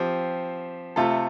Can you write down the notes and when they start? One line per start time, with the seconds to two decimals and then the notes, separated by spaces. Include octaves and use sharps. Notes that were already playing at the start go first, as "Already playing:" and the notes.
Already playing: F3 C4 G4
0.96 C3 A3 F4 A4